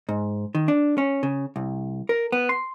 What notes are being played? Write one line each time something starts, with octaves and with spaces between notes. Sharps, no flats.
G#2
D#3
D4
C#4
C#3
C2
A#4
B3
C6